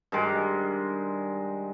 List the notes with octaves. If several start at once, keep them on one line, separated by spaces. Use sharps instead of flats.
G2 D#3 G#3